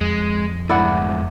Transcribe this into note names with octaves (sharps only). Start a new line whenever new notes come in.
F2 G#3
D2 G#2 E4 D5 F#5